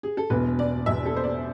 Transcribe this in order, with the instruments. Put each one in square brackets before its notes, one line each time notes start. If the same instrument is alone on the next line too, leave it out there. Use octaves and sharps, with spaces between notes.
[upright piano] G#4
A4
E1 E2 B2 B4
D5
E1 E2 B2 E5
A4
C5
D5